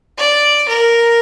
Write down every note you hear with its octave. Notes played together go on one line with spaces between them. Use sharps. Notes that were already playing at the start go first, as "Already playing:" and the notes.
D5
A#4